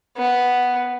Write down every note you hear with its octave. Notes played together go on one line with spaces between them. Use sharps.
B3